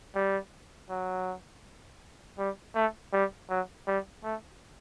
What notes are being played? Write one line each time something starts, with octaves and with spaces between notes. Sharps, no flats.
G3
F#3
G3
A3
G3
F#3
G3
A3